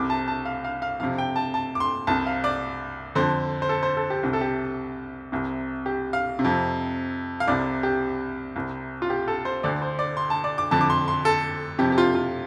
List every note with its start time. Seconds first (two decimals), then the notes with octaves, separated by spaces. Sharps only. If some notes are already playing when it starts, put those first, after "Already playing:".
Already playing: C2 C3 D6
0.10 A5
0.28 A5
0.45 F5
0.64 F5
0.82 F5
1.00 F2 C3 F5
1.18 G5
1.36 A5
1.54 A5
1.75 D6
1.80 C6
2.07 C2 C3 A5
2.26 F5
2.44 D5
3.15 F2 D3 C5
3.62 C5
3.69 A4
3.83 C5
3.97 A4
4.10 G4
4.23 C2 C3
4.33 A4
4.41 G4
5.32 C2 C3
5.86 G4
6.13 F5
6.39 C3
6.44 F2
7.40 F5
7.48 C2 C3 D5
7.83 G4
8.56 C2 C3
9.02 F4
9.10 G4
9.28 A4
9.45 C5
9.63 D2 D3 D5
9.82 C5
9.99 D5
10.17 C6
10.30 A5
10.44 D5
10.58 D6
10.71 F2 D3 A5
10.81 D6
10.90 C6
11.08 C6
11.25 A4
11.79 F2 C3 G4
11.92 G4
11.98 F4
12.15 F4